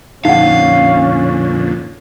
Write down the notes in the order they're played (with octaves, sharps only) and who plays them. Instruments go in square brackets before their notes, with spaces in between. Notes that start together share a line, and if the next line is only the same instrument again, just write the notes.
[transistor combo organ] F2 A#2 D3 [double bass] C#4 [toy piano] D#4 F#5 [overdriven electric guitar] F5